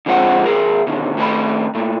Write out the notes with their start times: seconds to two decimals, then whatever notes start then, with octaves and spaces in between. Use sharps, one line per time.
0.06 D3 F3 G#3 C4 G#4 F#5
0.46 E2 G#4 A#4
0.87 B2 D3 D#3
1.17 A2 D#3 A3 C#5 G5 B5
1.75 A#2 A3